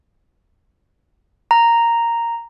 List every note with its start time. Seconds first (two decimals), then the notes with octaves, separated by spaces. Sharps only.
1.51 A#5